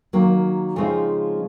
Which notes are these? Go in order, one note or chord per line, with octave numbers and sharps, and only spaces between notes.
D#3 F#3 A#3
C#3 F3 G#3 C4 D#4